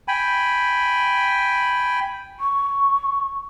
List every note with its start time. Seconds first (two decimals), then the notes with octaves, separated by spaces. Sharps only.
0.08 G5 G#5 B5
2.40 C#6